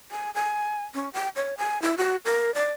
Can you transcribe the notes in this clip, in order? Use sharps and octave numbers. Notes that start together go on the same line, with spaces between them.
G#5
G#5
C#4
G5
C#5
G#5
E4
F#4
A#4
D5